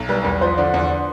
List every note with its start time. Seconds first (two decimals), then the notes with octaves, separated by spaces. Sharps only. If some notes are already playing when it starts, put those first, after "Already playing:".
Already playing: B1
0.09 G3 B4
0.24 E2 B4
0.41 F3 C5
0.58 D3 D5
0.74 E2